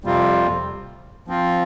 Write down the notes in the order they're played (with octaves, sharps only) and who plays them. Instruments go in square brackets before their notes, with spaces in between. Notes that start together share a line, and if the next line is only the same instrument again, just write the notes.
[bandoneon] F2 C3 G3 C4 F4
F3 C4 F4